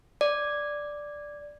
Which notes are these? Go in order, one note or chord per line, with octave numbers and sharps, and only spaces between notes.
D5